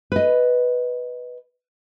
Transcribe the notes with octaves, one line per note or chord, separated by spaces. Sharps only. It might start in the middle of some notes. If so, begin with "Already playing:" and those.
B4 D#5